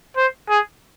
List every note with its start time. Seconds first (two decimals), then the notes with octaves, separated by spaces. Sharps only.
0.16 C5
0.49 G#4